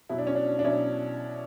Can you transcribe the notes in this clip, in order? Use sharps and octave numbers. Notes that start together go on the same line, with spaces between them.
B2 F#3 E4
D4
C#4
D4
D4
B2 F#3 C#4 E4